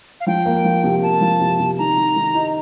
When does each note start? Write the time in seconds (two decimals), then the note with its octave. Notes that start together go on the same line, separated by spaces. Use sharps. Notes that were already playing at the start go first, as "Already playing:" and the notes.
0.21 F5
0.27 F3 G5
0.46 A#3
0.64 F3
0.84 C3
1.02 A#3 A5
1.21 F3
1.40 C3
1.59 C3
1.78 D#3 A#5
1.97 D#3
2.16 D#3
2.35 D#4